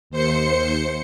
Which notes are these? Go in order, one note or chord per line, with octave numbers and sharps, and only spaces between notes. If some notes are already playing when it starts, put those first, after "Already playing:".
D#2 C5 C6 C#7